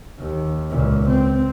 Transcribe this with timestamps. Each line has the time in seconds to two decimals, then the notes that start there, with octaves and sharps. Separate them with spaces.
0.19 D#2
0.70 C#2 A#2
1.08 C4